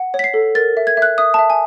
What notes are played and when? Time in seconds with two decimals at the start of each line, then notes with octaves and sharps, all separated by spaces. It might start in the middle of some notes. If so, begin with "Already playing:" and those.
Already playing: F#5
0.14 C#5
0.19 B6
0.24 C7
0.34 A4
0.55 A#4 A6
0.77 E5
0.87 G#6
0.97 E5 F#6
1.18 E5 D#6
1.34 E5 A5
1.50 G#5